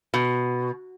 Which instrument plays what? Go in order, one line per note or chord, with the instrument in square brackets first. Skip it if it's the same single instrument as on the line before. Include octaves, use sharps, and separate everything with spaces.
[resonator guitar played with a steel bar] B2